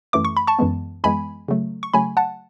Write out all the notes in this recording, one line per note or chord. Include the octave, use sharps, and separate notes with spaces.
F#2 E3 A3 D6
C#6
B5
A5 C#6
F#2 E3 G#3 B3
F#2 E3 G#3 B3 G#5 B5
C#3 F#3 A3
C#6
C#3 F#3 A3 G#5 B5
F#5 A5